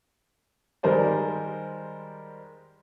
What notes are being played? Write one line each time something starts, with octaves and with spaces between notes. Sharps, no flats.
D#3 G3 G#3 A#4 C5 D5